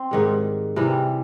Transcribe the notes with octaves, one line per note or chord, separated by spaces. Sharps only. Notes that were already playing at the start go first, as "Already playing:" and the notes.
Already playing: C4
G#2 D#3 G3
C3 E3 G3